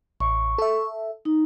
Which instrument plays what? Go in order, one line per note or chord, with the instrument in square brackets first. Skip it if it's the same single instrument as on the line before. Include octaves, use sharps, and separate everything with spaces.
[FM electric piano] A1 [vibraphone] C#6
[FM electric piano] A4 E5
[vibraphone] D#4